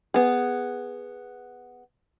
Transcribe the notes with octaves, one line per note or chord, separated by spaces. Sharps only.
B3 G#4